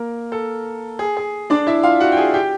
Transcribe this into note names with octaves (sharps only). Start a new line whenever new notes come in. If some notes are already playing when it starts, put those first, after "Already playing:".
Already playing: A#3 A#4
A4
G#4
G#4
D4 D5
E4 E5
F4 F5
F#4 F#5
G5
G#4 G#5
G4 G5